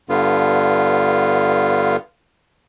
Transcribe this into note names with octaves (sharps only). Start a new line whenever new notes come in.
G2 D3 B3 F4